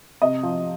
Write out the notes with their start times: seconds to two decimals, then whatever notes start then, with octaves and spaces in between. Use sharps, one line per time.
0.22 C3 D#5
0.43 F3